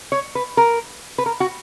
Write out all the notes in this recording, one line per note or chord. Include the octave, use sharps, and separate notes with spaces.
C#5
B4
A#4
B4
A#4
F#4